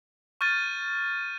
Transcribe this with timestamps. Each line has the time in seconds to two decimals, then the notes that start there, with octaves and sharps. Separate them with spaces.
0.41 C#6 F6 G6 A6 D#7